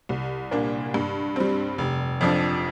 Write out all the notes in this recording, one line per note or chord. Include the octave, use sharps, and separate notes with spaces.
C2
A#2 A#3 D4
G2
G3 C4
F1
F2 F3 D4